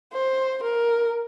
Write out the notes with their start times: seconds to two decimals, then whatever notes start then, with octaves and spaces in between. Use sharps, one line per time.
0.13 C5
0.64 A#4